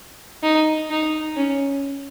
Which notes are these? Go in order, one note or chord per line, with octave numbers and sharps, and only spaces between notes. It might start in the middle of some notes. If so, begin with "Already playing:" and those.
D#4
D#4
C#4